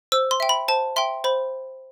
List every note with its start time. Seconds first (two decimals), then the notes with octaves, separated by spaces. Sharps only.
0.12 C5 E6
0.31 C6
0.40 E5 G5
0.49 B5
0.68 C5 A5
0.96 E5 G5 C6
1.24 C5 B5